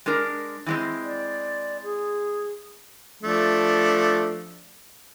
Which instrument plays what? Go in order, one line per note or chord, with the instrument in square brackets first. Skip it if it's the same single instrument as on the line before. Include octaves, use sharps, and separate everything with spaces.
[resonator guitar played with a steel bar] G#3 D4 A#4
E3 G#3 C4
[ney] D5
G#4
[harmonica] F3 A3 D4